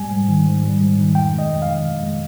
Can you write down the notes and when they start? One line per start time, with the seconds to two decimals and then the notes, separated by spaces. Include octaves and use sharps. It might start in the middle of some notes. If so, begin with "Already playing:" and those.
Already playing: G#2 G3 G#5
0.10 G#2
0.28 D#3
0.46 G#2
0.63 G3
0.80 G#2
0.98 D#3
1.15 F2 G5
1.33 G#3
1.39 D#5
1.51 F2
1.62 F5
1.68 D#3
1.86 F2
2.03 G#3